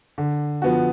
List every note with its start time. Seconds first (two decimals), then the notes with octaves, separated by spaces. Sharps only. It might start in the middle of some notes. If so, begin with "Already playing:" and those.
0.18 D3
0.62 F3 B3 F#4